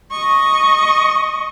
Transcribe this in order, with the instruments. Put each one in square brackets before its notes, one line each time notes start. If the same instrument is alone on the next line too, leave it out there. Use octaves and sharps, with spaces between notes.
[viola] D#5 C#6